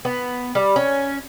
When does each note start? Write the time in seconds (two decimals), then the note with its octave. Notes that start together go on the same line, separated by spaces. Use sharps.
0.05 B3
0.55 G3
0.76 C#4